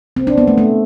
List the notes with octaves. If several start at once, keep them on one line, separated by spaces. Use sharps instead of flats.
C4
D4
B3
A3
A3